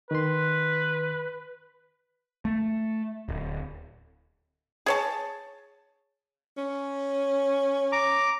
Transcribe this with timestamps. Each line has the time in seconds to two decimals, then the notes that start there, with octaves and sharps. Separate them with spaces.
0.11 D#3 B4 C6
2.45 A3
3.29 D1
4.86 G#4 C#5 A5
6.57 C#4
7.92 A#5 D6